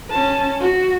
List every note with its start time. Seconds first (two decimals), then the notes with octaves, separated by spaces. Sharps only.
0.11 C#4 A5
0.60 F#4